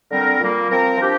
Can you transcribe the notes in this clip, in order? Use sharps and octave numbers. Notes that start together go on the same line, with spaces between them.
D3 G3 C4 A#4
A#2 G3 A#3
F3 C4 A#4
F3 D4 G4